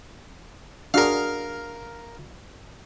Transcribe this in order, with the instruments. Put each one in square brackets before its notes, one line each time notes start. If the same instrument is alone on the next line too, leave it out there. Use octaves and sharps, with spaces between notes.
[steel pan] D4 F#4 G#4 [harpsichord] A#4 F5